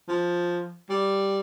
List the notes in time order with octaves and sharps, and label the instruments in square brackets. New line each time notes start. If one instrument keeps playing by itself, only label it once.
[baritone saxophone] F3
G3